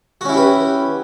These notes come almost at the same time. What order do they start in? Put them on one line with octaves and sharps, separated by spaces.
F#4 C#4 E4 G4 B4